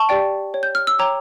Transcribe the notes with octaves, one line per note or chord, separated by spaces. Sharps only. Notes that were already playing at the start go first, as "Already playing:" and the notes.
Already playing: A5 C#6
G4 D5 G5
C#5 G5
G6
F6
E6
C#5 G5 A#5 D6